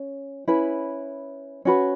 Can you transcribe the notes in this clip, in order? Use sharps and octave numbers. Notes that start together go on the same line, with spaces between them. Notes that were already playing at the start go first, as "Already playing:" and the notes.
Already playing: C#4
C#4 E4 B4
C#4 F#4 B4